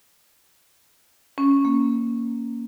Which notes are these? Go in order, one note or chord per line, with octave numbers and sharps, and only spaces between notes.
C#4
A#3